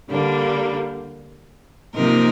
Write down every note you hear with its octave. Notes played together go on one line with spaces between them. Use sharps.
D3 G3 A#3 D4
C3 F3 A#3 D#4 A#4